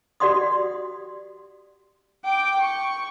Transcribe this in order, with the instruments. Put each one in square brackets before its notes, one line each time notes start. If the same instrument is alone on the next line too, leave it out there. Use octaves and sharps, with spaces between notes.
[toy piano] F#4 G4 D5 F#5 C6 D#6
[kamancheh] G5 D6
C#6